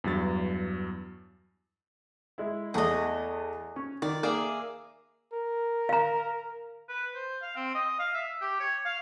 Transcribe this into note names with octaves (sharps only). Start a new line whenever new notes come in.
E2 G2 F#3 A6
G#3 E4
E2 A3 G#4 D#5 F#5
C#4
D#3 D5
A#3 G#4 D5 E5
A#4
F5 A#5
B4
C5
F5
C4
D#5
F5
E5
G4
C#5
F5